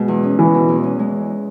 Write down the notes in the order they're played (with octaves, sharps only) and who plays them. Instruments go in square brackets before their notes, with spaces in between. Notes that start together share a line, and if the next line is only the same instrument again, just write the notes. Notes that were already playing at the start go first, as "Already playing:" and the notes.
Already playing: [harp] B2 G#3
E2
C#4
[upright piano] E3 [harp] G#3
[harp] B2
E2
C#4
G#3